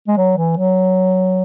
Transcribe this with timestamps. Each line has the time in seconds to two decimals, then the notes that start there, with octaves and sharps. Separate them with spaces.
0.08 G#3
0.17 F#3
0.37 E3
0.57 F#3